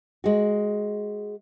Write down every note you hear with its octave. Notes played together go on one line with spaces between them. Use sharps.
G#3 F#4